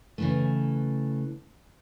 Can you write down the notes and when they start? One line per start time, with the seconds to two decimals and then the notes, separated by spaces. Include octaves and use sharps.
0.18 C#3 E3 A3